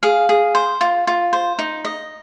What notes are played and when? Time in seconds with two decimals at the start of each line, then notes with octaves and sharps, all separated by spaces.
0.03 G#4 F5
0.29 G#4
0.55 C5
0.81 F4
1.07 F4
1.33 C5
1.59 D#4
1.85 D#5